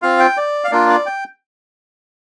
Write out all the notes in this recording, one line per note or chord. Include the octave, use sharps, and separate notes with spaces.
C4 F4 F5
G5
D5
F5
A#3 D4 F4 D5
D5
G5